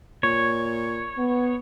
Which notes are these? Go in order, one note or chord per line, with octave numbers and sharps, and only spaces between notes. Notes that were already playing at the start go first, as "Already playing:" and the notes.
A#2 C#5
B3